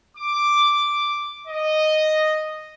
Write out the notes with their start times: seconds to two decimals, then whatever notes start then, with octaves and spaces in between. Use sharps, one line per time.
0.17 D6
1.48 D#5